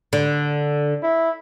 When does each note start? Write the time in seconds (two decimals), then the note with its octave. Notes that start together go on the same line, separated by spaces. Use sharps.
0.13 D3
1.03 E4